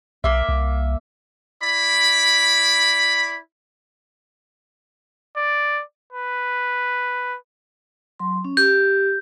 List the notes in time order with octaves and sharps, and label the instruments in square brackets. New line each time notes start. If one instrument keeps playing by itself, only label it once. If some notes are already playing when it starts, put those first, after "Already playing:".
[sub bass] B1 [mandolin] A#3 E5
[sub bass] C2
[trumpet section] E4 D5 B5
[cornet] D5
B4
[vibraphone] F#3 C6
C#4
[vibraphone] G4 [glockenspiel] G6